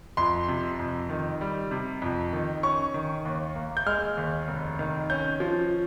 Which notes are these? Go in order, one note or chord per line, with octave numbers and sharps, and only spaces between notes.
F2 C6
C3
F2
D#3
G3
C3
F2
D#3
C#4 C#6
D#3
D#2
A#3
G6
G#3 F6
D#2
F1
D#3
C#4 G6
F3